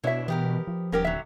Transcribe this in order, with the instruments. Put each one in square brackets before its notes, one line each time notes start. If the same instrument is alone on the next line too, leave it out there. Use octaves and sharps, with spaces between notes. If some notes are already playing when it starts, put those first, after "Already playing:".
[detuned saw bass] B2 [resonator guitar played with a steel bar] D4 E4 [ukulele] C#5 E5
[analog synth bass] E3 [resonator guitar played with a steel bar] B3 G4 A#4
[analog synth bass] F3
[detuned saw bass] D#1 [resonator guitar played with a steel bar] B3 C#4 G4 [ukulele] D#4 A#4
[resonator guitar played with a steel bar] D3 F#3 [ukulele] E5